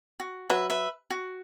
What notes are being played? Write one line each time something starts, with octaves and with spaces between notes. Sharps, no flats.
F#4
F#3 B4 E5
B4 E5
F#4